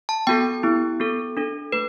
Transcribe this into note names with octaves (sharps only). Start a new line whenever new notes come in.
A5
B3 F#4 A4 G5
B3 E4 G4
B3 F#4 A4
D4 A4
A3 B4